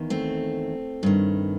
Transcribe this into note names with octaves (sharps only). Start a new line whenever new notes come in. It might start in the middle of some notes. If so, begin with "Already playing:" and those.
Already playing: E2 D#3
A3 C4
G2 D#3